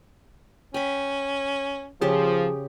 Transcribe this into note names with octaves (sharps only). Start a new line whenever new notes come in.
C#4 G5 B5
C#3 F3 G4 G#4 C5